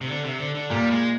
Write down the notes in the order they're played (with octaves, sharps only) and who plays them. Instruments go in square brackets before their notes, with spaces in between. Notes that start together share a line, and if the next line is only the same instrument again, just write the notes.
[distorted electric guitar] C3
D3
C3
D3
D3
[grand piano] A#2 [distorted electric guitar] G3
[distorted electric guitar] G#3